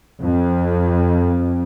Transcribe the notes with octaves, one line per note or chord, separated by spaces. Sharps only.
F2